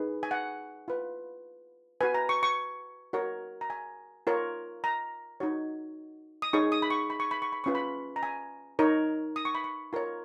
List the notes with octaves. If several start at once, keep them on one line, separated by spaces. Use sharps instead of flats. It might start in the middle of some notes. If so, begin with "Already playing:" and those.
Already playing: D#4 G#4 B4
G#5
F#5
F4 B4
F#4 B4 G#5
A#5
C#6
C#6
F#4 A#4 C#5
A#5
G#5
F4 A#4 C#5
A#5
D#4 F#4 C#5
D#6
D#4 G#4 C#5 C#6
D#6
B5
C#6
B5
C#6
B5
C#6
B5
C#4 F4 B4 C#6
B5
A#5
G#5
D#4 A#4 C#5
D#6
C#6
B5
C#6
F4 A#4 C#5